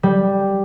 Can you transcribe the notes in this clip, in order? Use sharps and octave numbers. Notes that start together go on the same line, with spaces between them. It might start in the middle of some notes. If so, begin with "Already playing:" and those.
G3